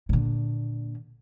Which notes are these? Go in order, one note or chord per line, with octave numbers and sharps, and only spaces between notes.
A#2 D3